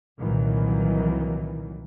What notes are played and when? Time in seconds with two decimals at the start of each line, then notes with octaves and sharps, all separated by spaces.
0.19 C2 A#2 D#3 E3 F#3